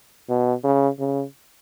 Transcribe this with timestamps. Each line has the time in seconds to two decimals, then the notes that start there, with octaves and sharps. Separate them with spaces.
0.29 B2
0.64 C#3
0.99 C#3